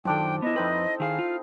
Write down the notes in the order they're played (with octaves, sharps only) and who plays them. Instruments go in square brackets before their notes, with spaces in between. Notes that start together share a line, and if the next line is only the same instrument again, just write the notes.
[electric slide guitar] F#2 D#3 [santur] F3 D4 A4 [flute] G5
[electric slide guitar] B3 E4 [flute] D#5
[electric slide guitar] F2 B4 [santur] C4 D#4 E4
[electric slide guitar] D#3 G#4 [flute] F5
[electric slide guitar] F4